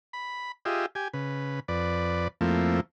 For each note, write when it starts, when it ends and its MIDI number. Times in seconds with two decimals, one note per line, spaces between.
0.13 0.52 83
0.65 0.86 65
0.65 0.86 67
0.65 0.86 68
0.65 0.86 75
0.65 0.86 76
0.95 1.08 67
0.95 1.08 80
1.13 1.60 49
1.13 1.60 71
1.68 2.28 41
1.68 2.28 71
1.68 2.28 74
2.41 2.80 41
2.41 2.80 53
2.41 2.80 57
2.41 2.80 58
2.41 2.80 60
2.41 2.80 64